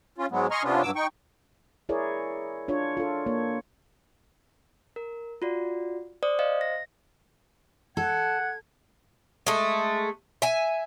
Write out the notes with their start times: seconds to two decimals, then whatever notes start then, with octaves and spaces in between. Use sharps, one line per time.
0.18 C#4 F4
0.31 G#2 F#3 G#3 B3
0.51 D#5 G#5 A#5 C6 C#6 F6
0.63 C3 B3 C#4 D4 F4
0.82 G2 F#3 D6 E6
0.95 D#4 G5 C#6
1.89 E4 G#4 A#4 C#5 D5
2.68 D4 F4 C#5
2.97 F4 A4
3.26 A#3 C#5
4.96 A#4
5.42 F4 F#4 D5
6.23 C5 D5 D#6
6.39 C5 D#5 F5
6.61 A#6
7.97 A4 F#5 G#6
9.47 G#3 A3
10.42 E5 G#5